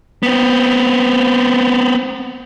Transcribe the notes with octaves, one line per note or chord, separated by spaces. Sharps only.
B3 C4